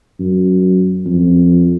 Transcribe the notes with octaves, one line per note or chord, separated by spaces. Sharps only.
F#2
F2